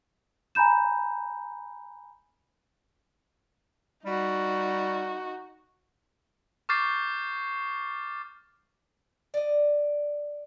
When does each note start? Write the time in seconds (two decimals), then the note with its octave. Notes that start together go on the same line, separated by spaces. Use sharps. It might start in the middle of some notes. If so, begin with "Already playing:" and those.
0.55 G#5 A#5 B5 G6 E7
4.05 G3 D#4 F#4
6.69 C#6 D6 F6 G6 A6 C7
9.34 D5 D#5